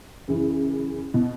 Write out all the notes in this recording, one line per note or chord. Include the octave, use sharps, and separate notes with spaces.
F#2 C#3 E3
B2